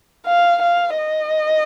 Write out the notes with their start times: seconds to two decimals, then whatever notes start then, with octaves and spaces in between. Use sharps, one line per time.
0.26 F5
0.62 F5
0.97 D#5